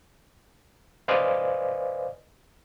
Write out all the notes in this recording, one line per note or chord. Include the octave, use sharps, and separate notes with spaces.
B4 C5 D5 D#5 F5 G#5